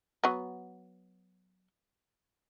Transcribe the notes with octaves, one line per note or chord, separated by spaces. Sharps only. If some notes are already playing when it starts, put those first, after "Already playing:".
F#3 B3